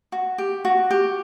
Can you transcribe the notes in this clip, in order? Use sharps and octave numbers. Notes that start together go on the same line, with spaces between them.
F#4
G4
F#4
G4